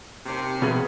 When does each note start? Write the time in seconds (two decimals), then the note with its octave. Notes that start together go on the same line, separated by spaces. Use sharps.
0.26 D#2 C3
0.62 B2 G#4